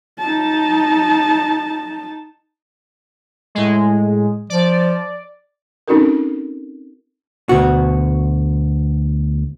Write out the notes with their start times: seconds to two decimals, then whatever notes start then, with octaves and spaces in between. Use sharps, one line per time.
0.19 D#4 A5
3.55 A2 G#3
4.50 F3 D5
5.88 C4 C#4 D#4 F#4 A4 A#4
7.49 D2 B2 F#4